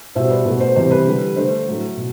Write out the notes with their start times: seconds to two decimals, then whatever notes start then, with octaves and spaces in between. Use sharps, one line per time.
0.15 B2 G3 C5 E5
0.30 B4 D5
0.45 B2 A3 B4
0.60 C5
0.76 C3 E3 G3 C5
0.91 B4
1.06 D3 G3
1.36 D3 A3 C5
1.67 A2 F#3 A3
1.97 B2